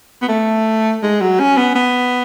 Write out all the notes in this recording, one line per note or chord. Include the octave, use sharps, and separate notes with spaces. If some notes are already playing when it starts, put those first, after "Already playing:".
B3
A3
G#3
F#3
C#4
B3
B3